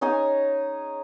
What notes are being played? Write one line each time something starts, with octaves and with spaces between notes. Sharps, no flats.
C#4 D#4 G#4 G#5